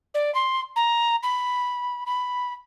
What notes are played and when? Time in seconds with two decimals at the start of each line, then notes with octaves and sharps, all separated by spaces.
0.14 D5
0.35 C6
0.76 A#5
1.23 B5
2.06 B5